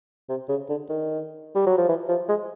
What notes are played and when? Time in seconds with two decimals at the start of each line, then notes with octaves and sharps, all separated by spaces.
0.29 C3
0.49 C#3
0.69 D3
0.89 D#3
1.55 G3
1.66 F#3
1.77 F3
1.88 E3
2.09 F3
2.28 G#3